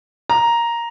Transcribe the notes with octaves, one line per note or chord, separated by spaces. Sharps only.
A#5